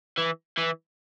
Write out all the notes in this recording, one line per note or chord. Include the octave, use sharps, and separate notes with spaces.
E3
E3